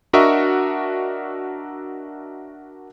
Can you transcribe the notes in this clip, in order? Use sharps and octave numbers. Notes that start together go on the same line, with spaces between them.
D4 F#4 A#4 D#5 E5 C#6